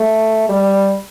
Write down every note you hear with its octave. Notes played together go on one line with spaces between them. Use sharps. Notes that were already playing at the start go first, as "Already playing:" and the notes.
Already playing: A3
G3